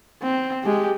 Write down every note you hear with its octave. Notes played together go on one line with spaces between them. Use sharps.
C4
G#3 G4